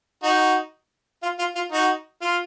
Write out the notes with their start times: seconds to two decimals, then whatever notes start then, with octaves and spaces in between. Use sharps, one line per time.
0.23 D#4 F#4
1.23 F4
1.39 F4
1.55 F4
1.72 D#4 F#4
2.21 F4